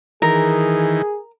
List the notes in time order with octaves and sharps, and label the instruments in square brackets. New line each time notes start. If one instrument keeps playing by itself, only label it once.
[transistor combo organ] D#3 E3 [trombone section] G#4 [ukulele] A#4